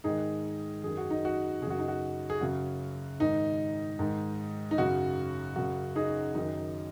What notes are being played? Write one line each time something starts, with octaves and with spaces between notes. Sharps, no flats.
G#2 D#3 D#4 G#4
F#2 D#3 G#4
F#4
D#4
F#4
F#2 C#3 F#4 G#4
D#4
F#4
G#4
F#2 C#3 F#4
G#2 D#3 D#4
G#2 D#3
D#4
F#2 C#3 F#4
F#2 C#3 F#4
D#4 G#4
F#2 D#3 D#4